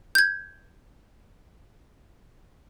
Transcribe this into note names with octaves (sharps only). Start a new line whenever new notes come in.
G6 G#6